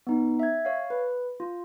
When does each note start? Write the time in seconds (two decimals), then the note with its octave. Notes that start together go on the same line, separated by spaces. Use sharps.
0.07 B3 D#4
0.39 E5 G#6
0.65 C#5 F5
0.90 B4
1.40 F4